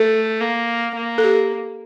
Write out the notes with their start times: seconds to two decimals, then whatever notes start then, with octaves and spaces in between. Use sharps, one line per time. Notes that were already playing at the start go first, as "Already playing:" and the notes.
Already playing: A3 A4
0.41 A#3
0.96 A#3
1.18 A4
1.24 G4